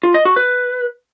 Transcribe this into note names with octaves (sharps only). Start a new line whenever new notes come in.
F4
D#5
F#4
B4